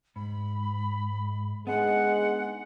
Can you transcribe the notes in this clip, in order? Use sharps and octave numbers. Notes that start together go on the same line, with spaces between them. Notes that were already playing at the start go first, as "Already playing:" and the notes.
G#2 B5
G#3 B3 D4 D#4 F#5